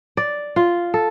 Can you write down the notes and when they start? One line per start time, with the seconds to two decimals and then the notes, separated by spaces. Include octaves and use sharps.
0.17 D5
0.56 F4
0.94 A4